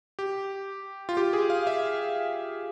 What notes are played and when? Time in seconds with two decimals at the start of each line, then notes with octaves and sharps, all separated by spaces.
0.19 G4
1.09 F4
1.17 G4
1.33 G#4
1.50 F5
1.67 E5